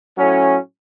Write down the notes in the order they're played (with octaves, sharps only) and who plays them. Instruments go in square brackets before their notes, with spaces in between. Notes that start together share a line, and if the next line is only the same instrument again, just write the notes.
[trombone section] A2 F#3 C#4